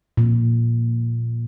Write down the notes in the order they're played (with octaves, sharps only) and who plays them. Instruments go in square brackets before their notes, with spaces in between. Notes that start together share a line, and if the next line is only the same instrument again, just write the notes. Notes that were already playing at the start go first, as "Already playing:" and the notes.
[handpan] A#2